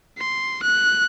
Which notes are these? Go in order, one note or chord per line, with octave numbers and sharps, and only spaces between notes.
C6
F#6